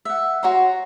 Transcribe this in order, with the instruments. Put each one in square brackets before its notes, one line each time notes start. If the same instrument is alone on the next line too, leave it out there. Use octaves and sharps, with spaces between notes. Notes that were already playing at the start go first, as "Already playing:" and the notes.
[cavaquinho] E5 F#5
F#4 C#5 A#5 C6